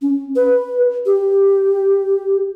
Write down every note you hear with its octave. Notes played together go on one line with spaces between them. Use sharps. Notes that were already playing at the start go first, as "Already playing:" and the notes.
C#4
B4
G4